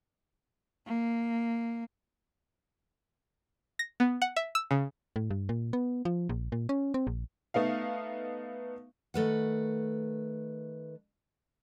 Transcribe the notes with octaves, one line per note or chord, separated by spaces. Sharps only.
A#3
A#6
B3
F#5
E5
E6
C#3
A2
G2
A#2
B3
F3
A#1
A#2
C#4
C4
A#1
A3 B3 D#4 F5
D#3 A3 B4 F#5